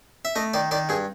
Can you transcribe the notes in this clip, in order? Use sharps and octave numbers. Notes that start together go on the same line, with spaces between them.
E5
A3 D#5
D#3 D5
D#3 D5
G2 G#4